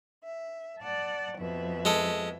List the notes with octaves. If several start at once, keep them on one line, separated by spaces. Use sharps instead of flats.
E5
D5 F#5 A5
F2 B2 E5
G#3 A4